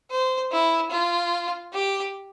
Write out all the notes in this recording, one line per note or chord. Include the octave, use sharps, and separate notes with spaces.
C5
E4
F4
G4